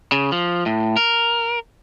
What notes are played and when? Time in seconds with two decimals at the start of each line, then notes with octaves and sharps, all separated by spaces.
0.12 C#3
0.32 F3
0.66 A2
0.97 A#4